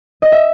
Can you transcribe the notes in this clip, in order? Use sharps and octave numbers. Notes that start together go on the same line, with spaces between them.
D#5
E5